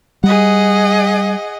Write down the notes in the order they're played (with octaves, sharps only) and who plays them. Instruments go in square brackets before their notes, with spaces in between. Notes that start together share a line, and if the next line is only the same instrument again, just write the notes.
[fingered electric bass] G3 [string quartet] G#4 D#5 F#5